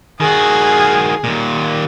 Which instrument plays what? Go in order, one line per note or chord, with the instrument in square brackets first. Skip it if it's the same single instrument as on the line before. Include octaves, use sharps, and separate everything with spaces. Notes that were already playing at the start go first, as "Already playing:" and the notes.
[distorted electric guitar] D#3 F#4 [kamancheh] G#4
[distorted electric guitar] D#2 A#2